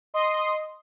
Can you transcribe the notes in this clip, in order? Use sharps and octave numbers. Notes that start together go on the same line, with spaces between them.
D#5 C6 D#6